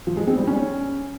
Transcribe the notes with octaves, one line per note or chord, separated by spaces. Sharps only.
F3
G#3
C4
G3
C#4